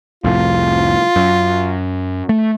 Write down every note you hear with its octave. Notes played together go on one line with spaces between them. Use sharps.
C2 F2 A2 F4
F#2
A3